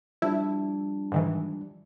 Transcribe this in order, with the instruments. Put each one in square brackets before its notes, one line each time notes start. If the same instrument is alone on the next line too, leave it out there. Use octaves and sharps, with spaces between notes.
[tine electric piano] F3 G3 D4 [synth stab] E4
[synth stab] G#2 D#3 E3